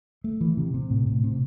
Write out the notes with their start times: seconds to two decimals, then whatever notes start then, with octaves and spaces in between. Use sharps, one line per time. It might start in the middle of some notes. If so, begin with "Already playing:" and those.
0.24 A3
0.41 E3
0.57 C3
0.74 C3
0.90 A2
1.07 A2
1.24 C3